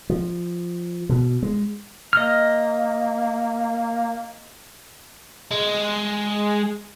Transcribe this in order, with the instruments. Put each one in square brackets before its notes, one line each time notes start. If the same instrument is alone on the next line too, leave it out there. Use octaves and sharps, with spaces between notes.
[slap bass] F3
B2
G#3
[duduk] A#3 [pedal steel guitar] D#5 F6
[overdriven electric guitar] G#3